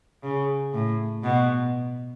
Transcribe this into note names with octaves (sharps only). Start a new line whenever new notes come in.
C#3
A2
B2